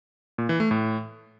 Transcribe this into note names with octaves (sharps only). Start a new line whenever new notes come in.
A#2
E3
A3
A2